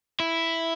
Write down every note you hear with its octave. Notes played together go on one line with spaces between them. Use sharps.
E4